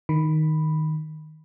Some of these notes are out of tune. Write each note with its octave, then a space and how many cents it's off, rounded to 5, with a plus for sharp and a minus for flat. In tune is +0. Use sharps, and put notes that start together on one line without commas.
D#3 +0 B5 +0